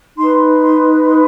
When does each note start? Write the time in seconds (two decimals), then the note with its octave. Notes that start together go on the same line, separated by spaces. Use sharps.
0.17 D#4 B4 C6
0.61 C6
1.06 C6